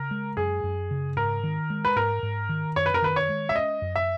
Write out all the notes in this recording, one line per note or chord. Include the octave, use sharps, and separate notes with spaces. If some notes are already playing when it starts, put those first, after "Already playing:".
Already playing: C#3 A#4
G#3
F#2 G#4
F#2
C#3
G#2 A#4
D#3
G#3
B4
G#2 A#4
G#2
D#3
F#2 C#5
B4
A#4
D#3 B4
C#5
G#3
E5
C#4 D#5
F#2
E5